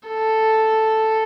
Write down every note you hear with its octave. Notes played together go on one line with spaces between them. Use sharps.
A4